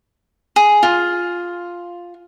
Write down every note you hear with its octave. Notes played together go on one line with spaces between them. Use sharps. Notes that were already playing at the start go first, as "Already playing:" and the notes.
G#4
F4